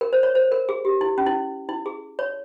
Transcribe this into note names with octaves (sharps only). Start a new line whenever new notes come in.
A#4
C5
C#5
C5
A#4
G#4
G4
E4
C#4
E4
E4
G#4
C#5